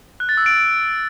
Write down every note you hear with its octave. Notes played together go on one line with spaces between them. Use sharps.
F#6
A6
E6
D7